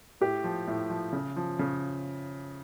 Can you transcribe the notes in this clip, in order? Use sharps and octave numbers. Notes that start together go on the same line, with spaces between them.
A2 G4
F3
A2
F3
C#3
F3
C#3